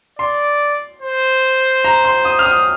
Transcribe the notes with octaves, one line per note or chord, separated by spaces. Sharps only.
D5 C6
C5
A#5
C6
D#6
F6
D#6